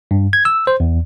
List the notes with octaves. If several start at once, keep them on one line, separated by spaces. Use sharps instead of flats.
G2
G#6
E6
C5
E2